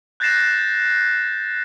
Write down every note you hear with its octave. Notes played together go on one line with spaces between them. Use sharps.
F#6 G6 A6 A#6 C7 E7